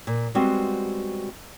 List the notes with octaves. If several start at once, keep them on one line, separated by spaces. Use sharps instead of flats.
A#2
G3 G#3 B3 C4 F#4